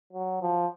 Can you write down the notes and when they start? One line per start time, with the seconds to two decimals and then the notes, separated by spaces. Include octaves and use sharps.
0.13 F#3
0.41 F3